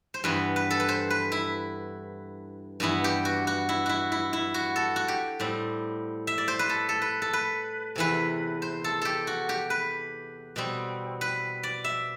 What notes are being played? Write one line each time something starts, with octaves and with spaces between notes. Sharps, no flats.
C5
G2 E3 B3 B4
B4
A4
B4
C5
B4
E4
G2 E3 B3 E4
G4
F#4
F#4
E4
E4 F#4
E4
E4
F#4
A4
F#4
G4
A2 G3 C4
E5
D5
C5
B4
A4
A4
B4
A4
B4
E2 C3 E3 B4
C5
A4
G4 A4
F#4
G4
B4
B2 G3 C4
B4
D5
E5